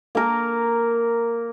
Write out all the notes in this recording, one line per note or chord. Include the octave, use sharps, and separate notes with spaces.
A#3 A#4